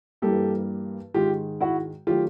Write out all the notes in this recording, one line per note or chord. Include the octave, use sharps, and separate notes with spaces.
G2 E3 G3 A#3 G4 A4
G#2 D#3 G#3 F4 G4
E4 F#4
D#3 F#3 A3 F4 G4